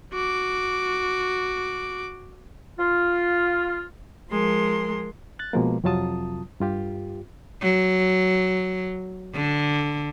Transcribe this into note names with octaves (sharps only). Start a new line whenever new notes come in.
F#4 D6
F4
F3 G#3 A#4 C6
F#6 A6
B2 F3 G#3 A#3
F2 C3 F#3 F4 A5 D#6
G2 F4 G4
F#3
D3